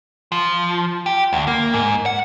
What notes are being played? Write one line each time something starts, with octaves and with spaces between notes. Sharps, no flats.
F3
G4
D2
A#3
G#2
F#5